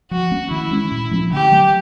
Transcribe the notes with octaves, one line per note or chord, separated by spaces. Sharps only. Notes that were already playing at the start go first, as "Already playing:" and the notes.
F3 F#4
A3 C#4
D#3 E4
G#3 C#4
A#2
F3 A3 C#4
D3 G4
F#3 A3